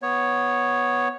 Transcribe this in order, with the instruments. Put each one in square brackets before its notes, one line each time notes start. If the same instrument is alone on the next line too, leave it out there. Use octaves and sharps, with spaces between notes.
[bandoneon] B3 C#5